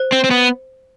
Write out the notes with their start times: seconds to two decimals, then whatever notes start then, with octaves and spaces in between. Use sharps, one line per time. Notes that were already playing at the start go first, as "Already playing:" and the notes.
Already playing: C5
0.12 C4
0.24 C4
0.31 B3